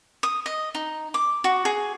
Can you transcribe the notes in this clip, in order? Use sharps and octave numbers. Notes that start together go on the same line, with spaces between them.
D#6
D#5
D#4
D6
F#4
G#4